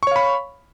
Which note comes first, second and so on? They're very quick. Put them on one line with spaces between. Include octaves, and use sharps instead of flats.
C#6 C#5 F5 B5